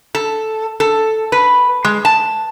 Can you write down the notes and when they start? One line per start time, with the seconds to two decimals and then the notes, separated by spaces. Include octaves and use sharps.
0.15 A4
0.80 A4
1.32 B4
1.85 G#3
2.05 A5